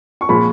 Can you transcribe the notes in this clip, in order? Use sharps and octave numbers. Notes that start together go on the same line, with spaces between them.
C#6
A#2 F3 G#3 B5